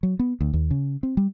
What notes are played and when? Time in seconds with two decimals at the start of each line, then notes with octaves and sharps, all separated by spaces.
0.03 F#3
0.19 B3
0.41 D2
0.53 D#2
0.71 C#3
1.03 C4
1.17 G3